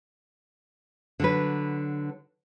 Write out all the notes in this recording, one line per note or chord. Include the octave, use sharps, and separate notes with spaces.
D3 F#3 B4